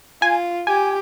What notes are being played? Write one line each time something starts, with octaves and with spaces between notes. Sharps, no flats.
F4 G#5
G4 G#5